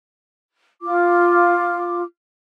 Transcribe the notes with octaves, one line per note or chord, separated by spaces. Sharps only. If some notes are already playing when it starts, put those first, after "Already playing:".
F4 D6